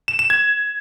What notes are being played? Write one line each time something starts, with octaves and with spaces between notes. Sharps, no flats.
E7
E7
G#6